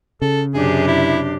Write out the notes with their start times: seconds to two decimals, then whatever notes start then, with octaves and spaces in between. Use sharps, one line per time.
0.22 C#3 A4
0.54 F#2 C3 D4 G4 G#4
0.87 E4